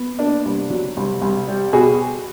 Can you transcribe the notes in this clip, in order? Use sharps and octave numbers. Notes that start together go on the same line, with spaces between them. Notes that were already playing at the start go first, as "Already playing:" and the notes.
Already playing: B3
A#3 D4
C2
F#3
C2
C2
G3
B2 F#4 G#4